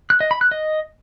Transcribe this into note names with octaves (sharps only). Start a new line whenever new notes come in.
F#6
D#5
B5
F#6
D#5